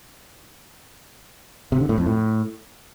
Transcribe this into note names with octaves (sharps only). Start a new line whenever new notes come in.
C3
D3
A2
F2
A2